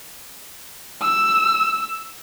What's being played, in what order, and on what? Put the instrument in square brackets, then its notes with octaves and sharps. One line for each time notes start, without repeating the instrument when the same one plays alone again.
[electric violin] E6